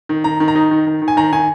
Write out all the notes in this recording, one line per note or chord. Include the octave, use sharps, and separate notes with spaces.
D#3
D#3 A#5
D#3
A#5
D#4
D#3
D#3
D#3
G#5
D#3 A#5
D#3 G#5